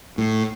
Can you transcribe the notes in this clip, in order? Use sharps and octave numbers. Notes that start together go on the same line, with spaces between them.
A2